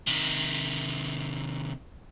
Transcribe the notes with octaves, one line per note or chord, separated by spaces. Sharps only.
C3 D#3